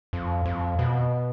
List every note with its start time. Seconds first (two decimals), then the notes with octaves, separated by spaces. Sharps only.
0.13 F2
0.46 F2
0.79 B2